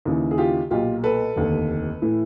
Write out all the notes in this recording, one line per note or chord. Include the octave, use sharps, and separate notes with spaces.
D#2 C#3 E3
G#4
F4 G4
B1 A#2 F4 G4
A4 B4
F1 D#2 D3
A2 E3